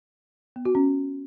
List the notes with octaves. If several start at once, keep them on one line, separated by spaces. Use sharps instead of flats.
B3
F#4
C#4